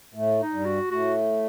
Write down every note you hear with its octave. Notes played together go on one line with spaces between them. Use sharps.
A2 A3
D#4
G2 G3
F#4
A2 A3 F#4